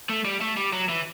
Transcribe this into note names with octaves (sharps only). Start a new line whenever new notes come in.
A3
G3
A3
G3
F#3
E3